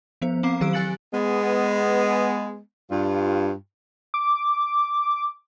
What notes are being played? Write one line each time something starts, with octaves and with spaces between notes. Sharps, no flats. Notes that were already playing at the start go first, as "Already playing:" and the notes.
F3 B3 C5
C4 F5 A#5 D6 C7
D#3 F#3 G4 F5 E6 D7
G4 G#5 F#6 A6 C#7 F#7
G#3 B3
G2 F4
D6